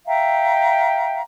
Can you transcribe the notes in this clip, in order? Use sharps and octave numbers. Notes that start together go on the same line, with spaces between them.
E5 F5 G5 A#5